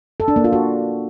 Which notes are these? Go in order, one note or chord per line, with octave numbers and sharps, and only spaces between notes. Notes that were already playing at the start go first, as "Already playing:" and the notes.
A4
D4
A#3
F4
F#4